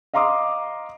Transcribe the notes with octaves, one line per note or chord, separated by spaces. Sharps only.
D#5 F5 A#5 C6 D6 D#6